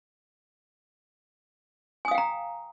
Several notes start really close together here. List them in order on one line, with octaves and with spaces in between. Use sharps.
G#5 D#6 F5 G5 A#5